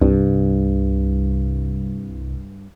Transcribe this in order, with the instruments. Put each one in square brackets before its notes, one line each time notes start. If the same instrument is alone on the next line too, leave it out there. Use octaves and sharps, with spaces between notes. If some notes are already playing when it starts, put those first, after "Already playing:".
[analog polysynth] C2 [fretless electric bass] G2